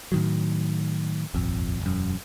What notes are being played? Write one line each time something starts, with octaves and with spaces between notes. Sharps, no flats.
A2 D#3 F#3
D#1 G#1 F2
E1 F#2